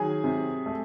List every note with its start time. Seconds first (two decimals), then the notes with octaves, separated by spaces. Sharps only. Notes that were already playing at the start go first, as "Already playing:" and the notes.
Already playing: D#3 F#3 G#4 G#5
0.24 C3
0.66 A3